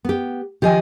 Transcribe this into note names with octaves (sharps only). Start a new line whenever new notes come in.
B3 G4
D#3 F3 G4 D#5 G#5